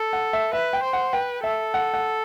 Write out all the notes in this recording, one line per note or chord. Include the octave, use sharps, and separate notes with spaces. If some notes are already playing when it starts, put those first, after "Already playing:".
Already playing: A4
F#5
E5
B4 E5
G5
C5
F#5
B4 G5
A4 E5
F#5
F#5